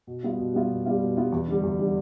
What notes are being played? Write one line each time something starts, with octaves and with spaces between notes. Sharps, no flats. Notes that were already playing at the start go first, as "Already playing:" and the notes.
B2
G3 B3 F4
B2
G3 B3 F4
B2
G3 B3 F4
B2
G3 B3 F4
E2
D3 G3
E2
D3 G3